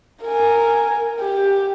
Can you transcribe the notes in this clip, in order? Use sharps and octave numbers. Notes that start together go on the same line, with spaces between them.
A#4 G#5
G4